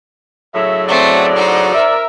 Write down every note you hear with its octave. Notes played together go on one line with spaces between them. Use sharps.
A2 C#3 F#3 E5
A3 C4 D5
D#4 C5
A#4 E5